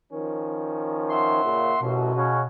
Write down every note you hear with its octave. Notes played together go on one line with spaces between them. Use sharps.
D#3 F3 C#4
E5 F#5 C6
A#2 C#3
A1 F#2 B2
C#3 C#4 F#4